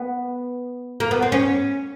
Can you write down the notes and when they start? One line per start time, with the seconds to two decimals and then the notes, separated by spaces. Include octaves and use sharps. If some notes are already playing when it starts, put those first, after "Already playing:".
Already playing: B3
1.00 A#3
1.11 B3
1.22 C4
1.32 C#4